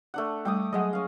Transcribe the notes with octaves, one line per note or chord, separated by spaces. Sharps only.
A3 D4 F#5
G3 A3 G5 D6 D#6
F#3 G#3 D#5 F#5
C#4 F5